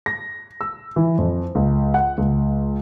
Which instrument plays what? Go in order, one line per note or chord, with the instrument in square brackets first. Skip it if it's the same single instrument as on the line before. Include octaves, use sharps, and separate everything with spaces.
[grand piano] A#6
E6
E3
F2
C#2
F#5
C#2